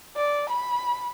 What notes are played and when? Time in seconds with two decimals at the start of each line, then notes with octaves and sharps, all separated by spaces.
0.16 D5
0.50 B5